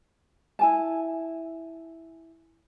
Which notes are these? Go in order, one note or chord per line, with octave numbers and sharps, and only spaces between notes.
E4 G#5 A5